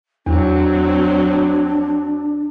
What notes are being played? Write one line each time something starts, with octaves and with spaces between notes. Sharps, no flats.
E2 F#3 C4 D4